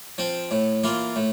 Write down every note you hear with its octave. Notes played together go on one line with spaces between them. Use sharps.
F3 C4
A2
E3 A#3 F4
A2